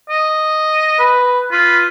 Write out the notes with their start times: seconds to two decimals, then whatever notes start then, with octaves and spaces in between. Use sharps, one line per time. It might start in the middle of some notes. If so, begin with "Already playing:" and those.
0.10 D#5
0.99 B4
1.52 F4 B4